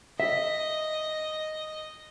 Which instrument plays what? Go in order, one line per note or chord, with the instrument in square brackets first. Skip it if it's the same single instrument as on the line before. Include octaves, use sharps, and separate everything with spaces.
[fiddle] D#5 [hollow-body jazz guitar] E5